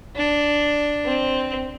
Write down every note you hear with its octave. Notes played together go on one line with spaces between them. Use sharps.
D4
C4